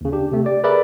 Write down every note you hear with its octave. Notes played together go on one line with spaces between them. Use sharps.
D#2 C#3
D4 G4
C3 A3
G4 D5
G#4 A#4 B4 D5 E5 B5